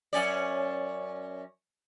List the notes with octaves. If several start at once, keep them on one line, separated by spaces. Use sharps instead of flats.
F#2 C#4 D5